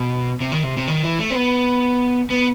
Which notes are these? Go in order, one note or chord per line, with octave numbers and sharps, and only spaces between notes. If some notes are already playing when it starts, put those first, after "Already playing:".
Already playing: B2
C3
D#3
C3
C3
D#3
E3
A3
C4
B3
B3